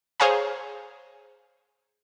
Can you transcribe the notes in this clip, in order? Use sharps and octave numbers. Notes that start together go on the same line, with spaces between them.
G#4 C5 C#5 F5 G#5 A#5